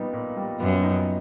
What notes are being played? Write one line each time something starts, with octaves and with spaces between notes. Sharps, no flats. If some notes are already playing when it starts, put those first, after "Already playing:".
Already playing: A#2 G3 B3 D#4
A#2
G3
F#2 B3
D#4